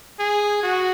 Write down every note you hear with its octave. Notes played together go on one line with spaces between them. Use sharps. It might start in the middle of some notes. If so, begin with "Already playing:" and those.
G#4
F#4